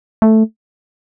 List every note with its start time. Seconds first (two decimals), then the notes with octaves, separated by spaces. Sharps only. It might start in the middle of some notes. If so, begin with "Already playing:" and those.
0.22 A3